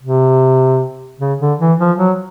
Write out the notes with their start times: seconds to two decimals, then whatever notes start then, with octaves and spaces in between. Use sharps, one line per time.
0.03 C3
1.20 C#3
1.40 D3
1.60 E3
1.79 F3
1.98 F#3